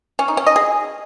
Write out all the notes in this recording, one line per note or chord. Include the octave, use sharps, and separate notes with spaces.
C#4
D#4
C#4
D#5
G#4